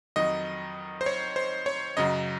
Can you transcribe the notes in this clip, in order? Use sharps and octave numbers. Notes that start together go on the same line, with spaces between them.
F2 D#3 F#3 D#5
C5
C#5
C5
C#5
F#2 C#3 F#3 D#5